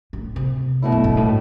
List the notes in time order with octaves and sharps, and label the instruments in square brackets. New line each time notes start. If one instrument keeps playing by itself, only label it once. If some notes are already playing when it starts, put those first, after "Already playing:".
[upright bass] A2
C3
[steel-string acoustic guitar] B2 A3 E4
[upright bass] F#2
G2
A2